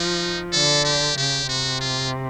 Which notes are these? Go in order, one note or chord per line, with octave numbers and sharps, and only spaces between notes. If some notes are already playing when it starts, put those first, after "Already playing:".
Already playing: F3 D#4
D3 A4
G4
C#3 G4
C3 F#4
F4